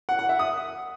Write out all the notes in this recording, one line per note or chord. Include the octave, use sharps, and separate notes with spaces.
F#5
F#5
E5
D#6